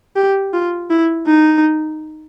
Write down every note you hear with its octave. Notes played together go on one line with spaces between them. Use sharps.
G4
F4
E4
D#4